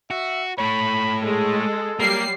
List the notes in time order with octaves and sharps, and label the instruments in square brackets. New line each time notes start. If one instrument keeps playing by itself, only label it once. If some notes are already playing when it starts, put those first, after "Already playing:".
[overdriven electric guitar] F#4 [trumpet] E5
[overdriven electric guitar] A3 C#5 [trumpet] B5
[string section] G#3 [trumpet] A4
[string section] F#3 G3 C7 [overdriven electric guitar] A#3